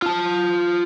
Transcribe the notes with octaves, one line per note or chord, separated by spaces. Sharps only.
F4 A5